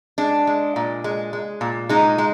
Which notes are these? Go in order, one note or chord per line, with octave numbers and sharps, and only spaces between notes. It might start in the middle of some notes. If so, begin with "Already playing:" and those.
G#3 D4
G#3
A#2
G#3
G#3
A#2
G#3 D#4
G#3